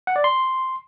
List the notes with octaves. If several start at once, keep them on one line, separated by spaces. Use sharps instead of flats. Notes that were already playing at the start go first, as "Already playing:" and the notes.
F#5
D5
C6